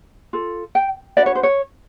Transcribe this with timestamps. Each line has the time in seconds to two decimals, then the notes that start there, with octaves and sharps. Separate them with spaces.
0.33 F4 A4
0.75 G5
1.17 D4 F#4 B4 D5
1.26 C#5
1.35 C5
1.43 C#5